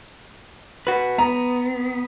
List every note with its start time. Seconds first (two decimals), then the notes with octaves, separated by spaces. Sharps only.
0.87 F#4 B4
1.18 B3 A#5